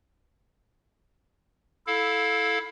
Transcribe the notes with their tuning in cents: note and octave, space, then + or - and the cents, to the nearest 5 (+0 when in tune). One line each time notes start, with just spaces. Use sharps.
E4 +0 A4 -10 F5 +25